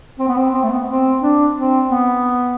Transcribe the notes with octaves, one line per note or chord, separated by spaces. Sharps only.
C4
B3
C4
C4
A3
B3
C4
D4
C4
B3